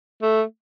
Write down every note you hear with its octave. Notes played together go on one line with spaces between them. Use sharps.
A3